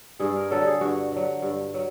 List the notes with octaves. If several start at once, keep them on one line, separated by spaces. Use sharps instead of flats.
G2 G#4
A#4
D3 F#3 A4
G#4
G2 F#4
D3 F#3
G2
F#3